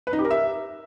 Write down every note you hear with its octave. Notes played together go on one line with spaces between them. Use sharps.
B4
D#4
G4
A#4
E5